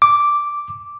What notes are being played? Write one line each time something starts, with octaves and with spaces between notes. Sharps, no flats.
D6